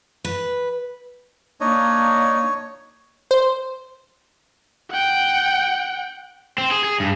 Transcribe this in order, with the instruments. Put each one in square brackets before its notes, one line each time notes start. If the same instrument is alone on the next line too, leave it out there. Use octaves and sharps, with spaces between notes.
[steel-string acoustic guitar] B4
[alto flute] A#3 [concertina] D4 D#4 D#5 [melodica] C#5
[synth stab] C5
[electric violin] F#5 G5
[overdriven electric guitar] C4
G#4
G#4
G2